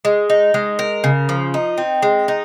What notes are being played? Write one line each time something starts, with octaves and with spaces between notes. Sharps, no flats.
G#3
D#4
G#3
A#4
C#3
F3
D#4
C4
G#3
D#4